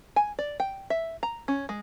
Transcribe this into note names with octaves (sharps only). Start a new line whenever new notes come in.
G#5
D5
G5
E5
A#5
C#4
G#3